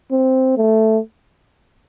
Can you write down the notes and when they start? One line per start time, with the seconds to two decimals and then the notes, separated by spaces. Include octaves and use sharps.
0.11 C4
0.57 A3